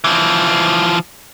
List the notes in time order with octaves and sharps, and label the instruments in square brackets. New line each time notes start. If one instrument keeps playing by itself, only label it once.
[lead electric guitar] E3 F3